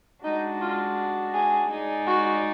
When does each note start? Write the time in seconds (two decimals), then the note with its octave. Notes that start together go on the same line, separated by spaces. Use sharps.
0.24 G#3 D4 D#4 F#4
0.61 F4
1.34 G#4
1.70 G#3 D#4 G#4 D5
2.07 F#4